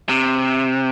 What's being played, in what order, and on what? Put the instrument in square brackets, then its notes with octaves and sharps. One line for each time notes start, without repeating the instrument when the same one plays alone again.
[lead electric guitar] C3